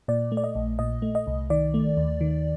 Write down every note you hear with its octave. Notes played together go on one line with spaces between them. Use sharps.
A#2 D5
A3
D5
D#5
A#1
A#2 D#5
A3
D#5
C2
D#3 D5
A3
D#2
D#3